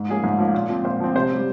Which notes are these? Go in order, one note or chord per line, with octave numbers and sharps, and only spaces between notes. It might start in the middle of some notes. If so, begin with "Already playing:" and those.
Already playing: G#2
F3 A#3 C#4 G#4
G#2
F3 A#3 C#4
A#2
F3 C4
A#2 C5
F3 C4
C3 C5
G3 C#4